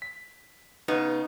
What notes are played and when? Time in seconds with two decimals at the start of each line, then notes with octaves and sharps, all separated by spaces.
0.02 B6
0.88 C#3 B3 D#4